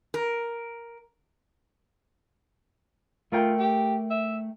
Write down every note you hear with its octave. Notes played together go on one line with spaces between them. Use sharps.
A#4
A3 F4 A#4 G5
G4
E5